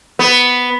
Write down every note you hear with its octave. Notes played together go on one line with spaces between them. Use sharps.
B3